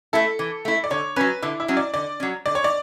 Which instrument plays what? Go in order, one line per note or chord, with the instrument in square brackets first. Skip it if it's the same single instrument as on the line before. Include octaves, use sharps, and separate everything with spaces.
[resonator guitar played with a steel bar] A3 E4 [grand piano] A4
[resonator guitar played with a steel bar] E3
A3 E4
[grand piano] D5
[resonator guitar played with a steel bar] D3 [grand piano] C#5
[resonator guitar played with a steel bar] F#3 C#4 [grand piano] B4
[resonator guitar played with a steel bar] D3 [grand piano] E4
[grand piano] E4
[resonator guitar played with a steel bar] F#3 C#4
[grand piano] D5
[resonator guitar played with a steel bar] D3 [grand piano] D5
[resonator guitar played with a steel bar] F#3 C#4
[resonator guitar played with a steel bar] D3 [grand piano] D5
[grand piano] C#5
D5